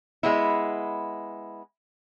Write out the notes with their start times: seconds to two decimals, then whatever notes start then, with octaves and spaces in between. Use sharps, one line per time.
0.23 G#3 B3 E4